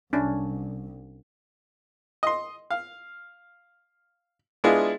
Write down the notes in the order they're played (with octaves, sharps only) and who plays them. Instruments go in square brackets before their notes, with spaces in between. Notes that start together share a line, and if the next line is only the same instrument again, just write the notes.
[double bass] C2 [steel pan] C#4 D4
[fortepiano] D#5 C6
F5
G#3 B3 D4 E4 F4 G#4